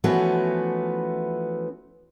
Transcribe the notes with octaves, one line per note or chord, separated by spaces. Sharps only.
E3 F3 A3 B3 C#4 F#4